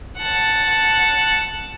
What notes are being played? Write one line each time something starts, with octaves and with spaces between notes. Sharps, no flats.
F#5 A5